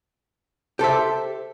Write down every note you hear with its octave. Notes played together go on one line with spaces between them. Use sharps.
G4 A4 C5 E5